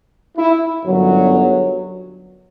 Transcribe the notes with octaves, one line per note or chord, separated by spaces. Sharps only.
E4
G1 F#2 F#3